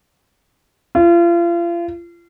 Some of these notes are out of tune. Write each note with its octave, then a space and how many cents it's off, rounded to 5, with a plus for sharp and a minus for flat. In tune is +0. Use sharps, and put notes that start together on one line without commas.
F4 -35